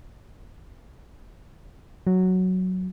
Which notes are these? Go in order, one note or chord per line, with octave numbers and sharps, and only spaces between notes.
F#3